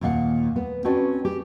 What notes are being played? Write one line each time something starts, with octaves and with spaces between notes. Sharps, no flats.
D#2 A#2 F5 F#5
B3
C4 C#4 F#4 B4 D5 A5
G4